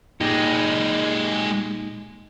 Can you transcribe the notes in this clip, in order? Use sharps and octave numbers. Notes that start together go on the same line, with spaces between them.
A#2 G#3 D#4 G4